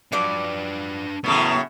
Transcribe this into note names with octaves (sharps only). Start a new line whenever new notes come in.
F3 F#3 D4 B4 D5
F#2 A2 C#3 B3 E4